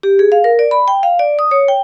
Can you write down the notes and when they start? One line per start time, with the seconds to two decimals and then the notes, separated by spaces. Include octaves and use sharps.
0.03 G4
0.19 G#4
0.32 F5
0.44 A#4
0.59 D5
0.71 B5
0.88 G5
1.03 F5
1.19 D5
1.39 D#6
1.51 C#5
1.68 G5